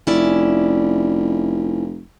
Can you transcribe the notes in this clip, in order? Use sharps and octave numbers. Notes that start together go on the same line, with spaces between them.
F1 C#4 E4 D5